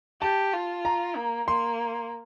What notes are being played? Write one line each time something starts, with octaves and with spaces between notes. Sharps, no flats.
G4 A5
F4
A#5
A#3
A#3 C6